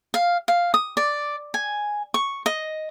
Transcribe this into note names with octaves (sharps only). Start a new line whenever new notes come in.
F5
F5
D#6
D5
G#5
C#6
D#5